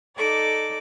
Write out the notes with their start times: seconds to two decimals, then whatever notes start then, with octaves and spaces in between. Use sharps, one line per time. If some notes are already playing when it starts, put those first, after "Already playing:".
0.17 D#4 A4 D5 D6